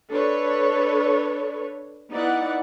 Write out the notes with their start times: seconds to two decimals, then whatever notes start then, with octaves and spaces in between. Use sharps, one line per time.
0.11 D4 A4 B4 C#5
2.11 B3 D#4 E4 D5 F#5